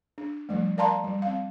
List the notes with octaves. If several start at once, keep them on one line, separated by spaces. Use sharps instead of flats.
D4
F3 G3 A3
A#4 D5 F5 A5 A#5 C6
G3
C4 F5